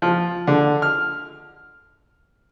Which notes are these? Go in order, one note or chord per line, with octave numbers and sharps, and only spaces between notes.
F3
D3
F6